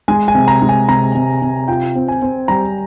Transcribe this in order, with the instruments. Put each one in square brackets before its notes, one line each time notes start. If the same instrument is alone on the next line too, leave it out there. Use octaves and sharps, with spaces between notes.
[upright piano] G#3 [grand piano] G#5
[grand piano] G#5
[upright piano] C3
[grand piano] A#5
[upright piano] G#3
[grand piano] G#5
[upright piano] C3 [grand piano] A#5
[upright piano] C3
C3
[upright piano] F4 [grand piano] G5
[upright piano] C4
[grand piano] G#5
[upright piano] C4
[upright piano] G3 [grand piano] A#5